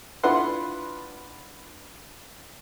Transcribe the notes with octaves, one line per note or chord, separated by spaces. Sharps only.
D4 E4 F4 B4 F#5 C6